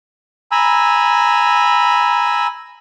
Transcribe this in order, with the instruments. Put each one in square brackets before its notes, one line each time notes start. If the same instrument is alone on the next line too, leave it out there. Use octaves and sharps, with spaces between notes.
[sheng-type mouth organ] G#5 A#5 B5 E6